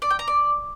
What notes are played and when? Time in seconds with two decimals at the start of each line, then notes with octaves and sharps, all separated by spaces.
0.02 D5
0.10 G5
0.19 A#5
0.28 D5